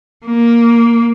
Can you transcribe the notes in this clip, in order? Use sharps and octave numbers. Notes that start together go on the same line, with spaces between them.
A#3